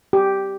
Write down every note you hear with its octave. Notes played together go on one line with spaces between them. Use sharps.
G4